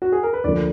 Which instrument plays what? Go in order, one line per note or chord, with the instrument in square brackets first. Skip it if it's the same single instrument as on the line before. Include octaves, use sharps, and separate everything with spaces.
[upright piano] F#4
G#4
A#4
B4
[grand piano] D2 D3 F3 A#3 [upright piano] D5